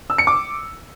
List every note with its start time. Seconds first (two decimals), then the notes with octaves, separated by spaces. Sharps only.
0.10 E6
0.18 C#7
0.27 D6